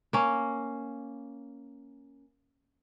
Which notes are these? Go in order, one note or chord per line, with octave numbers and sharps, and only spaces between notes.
A#3 C#4